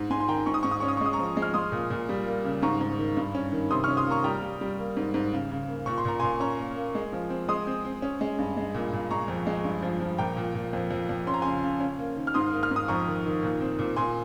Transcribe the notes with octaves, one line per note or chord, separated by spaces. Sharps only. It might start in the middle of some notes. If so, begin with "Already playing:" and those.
Already playing: G#2
G#2 G#5 C6
C6
D#3 G5 A#5
G#2 C#6
D#6
G#2 C#6
D#6
C#4 C#6
D#6
C#6
G#3 D#6
A#5 C#6
F3
G#3
F6
G#3 C6 D#6
A#2
A#2
G3
A#3
C#3
G#2 A#5 C#6
G#2
D#3
G2
C#4
D#3
C3 C6 D#6
C#6 F6
C#4
C6 D#6
A#3 A#5 C#6
G3 G5 A#5
G3
G3
A#3
G#2
G#2
C#3
C#3
A#3
A#2 C#6
C6
A#2 A#5
G#5 C6
A#2
C#4 A#5 C#6
A#3
A#3
G#3
F3
C4
G#3 C6 D#6
C4
C4
C#4
G#3
G2
G#3
A#2
A#2
G#3 A#5 C#6
F2
G#3
G2
F3
F3
A#2 G5 A#5
A#2
A#2
F2
F2
F2
C#4 C6
A#5
C#3 G#5 C6
C#3
C#4
A#3
D#3
F6
G#2 C6 D#6
A#3
F6
G#2 D#6
F2 A#5 C#6
D#3
D#3
A#2
C4
A#2
A#2 G#5 C6